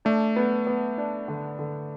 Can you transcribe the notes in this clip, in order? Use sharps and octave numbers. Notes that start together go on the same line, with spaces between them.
A3 D4
B3
B3
D4
D3
D3